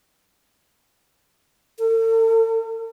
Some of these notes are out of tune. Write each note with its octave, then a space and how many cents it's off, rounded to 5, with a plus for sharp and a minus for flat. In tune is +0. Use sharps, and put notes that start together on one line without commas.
A4 +45